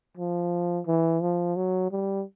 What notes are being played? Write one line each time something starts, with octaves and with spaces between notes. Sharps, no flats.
F3
E3
F3
F#3
G3